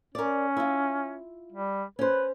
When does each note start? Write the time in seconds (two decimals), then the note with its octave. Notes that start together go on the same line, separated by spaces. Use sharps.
0.15 C#4 A#4 D5
0.57 E4 F4
1.52 G3
1.99 C#4 B4 C5